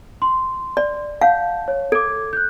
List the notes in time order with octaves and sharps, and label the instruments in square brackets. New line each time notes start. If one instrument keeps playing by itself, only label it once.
[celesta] C6
[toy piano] D5
[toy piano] F5 [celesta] F#5 A5 G6
[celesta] C#5
[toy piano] A4 [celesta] D6 G#6
[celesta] F#6 G6